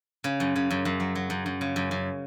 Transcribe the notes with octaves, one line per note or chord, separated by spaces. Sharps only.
C#3
F#2
C#3
F#2
F#2
F#3
F#3
F#2
F#2
C#3
F#2
F#2